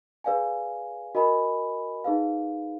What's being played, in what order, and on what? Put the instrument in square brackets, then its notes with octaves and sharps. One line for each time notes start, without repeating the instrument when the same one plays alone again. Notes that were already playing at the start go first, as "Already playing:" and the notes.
[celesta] G#4 B4 D5 F5 G#5
F#4 A#4 D#5 G#5 B5
D#4 G#4 B4 F5